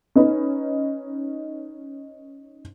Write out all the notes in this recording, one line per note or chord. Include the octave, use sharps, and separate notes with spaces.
C#4 D#4 B4